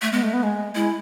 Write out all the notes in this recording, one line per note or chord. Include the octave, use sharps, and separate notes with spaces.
A3
G#3 B3
A3
B3
G#3
G#3 E4